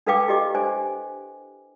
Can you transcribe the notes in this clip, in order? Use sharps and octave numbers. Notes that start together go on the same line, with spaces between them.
D4 A4 B4 F5 G5 D6
E4 G4 D#5 D6
D4 C5 G#5